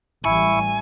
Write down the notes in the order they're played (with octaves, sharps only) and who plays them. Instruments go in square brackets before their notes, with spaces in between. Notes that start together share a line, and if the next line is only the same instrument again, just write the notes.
[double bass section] A1 E3 G3 [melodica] E4 C#6 [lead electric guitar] G#5